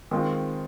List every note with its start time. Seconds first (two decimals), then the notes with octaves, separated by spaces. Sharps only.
0.11 D#3 G#3 C4 F4